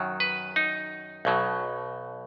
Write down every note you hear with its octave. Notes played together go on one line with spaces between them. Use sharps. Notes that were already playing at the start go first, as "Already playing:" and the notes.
Already playing: F#2 D#3 F#3
B4
D#4
B1 B2 F#3